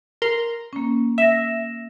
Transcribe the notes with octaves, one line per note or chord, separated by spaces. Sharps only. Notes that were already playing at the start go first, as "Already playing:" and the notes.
A#4 A#5 C6
A#3 C#4
E5 A#6 E7